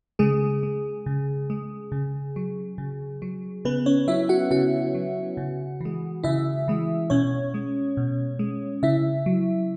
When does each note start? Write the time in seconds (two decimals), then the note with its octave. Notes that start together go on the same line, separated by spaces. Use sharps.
0.19 C#3 G#3 G#4
0.63 G#3
1.06 C#3
1.50 G#3
1.92 C#3
2.36 F#3
2.78 C#3
3.22 F#3
3.65 C#3 B3 B4
3.86 C#4 C#5
4.08 F#3 E4 E5
4.29 F#4 F#5
4.51 C#3 F#4 F#5
4.94 F#3
5.37 C#3
5.81 E3 G#3
6.24 C#3 E4 E5
6.68 E3 G#3
7.10 B2 C#4 C#5
7.54 G#3
7.97 B2
8.39 G#3
8.83 C#3 E4 E5
9.26 F#3